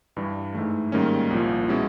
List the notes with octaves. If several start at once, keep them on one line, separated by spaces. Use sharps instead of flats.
G2 E3 G3
G#2 E3 A3
G#2 D#3 G3 A#3 C#4
C2 A#2 F3
B2 G#3 C#4 E4